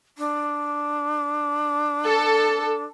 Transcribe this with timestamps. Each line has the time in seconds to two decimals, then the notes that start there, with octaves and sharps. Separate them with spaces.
0.18 D4
2.05 A4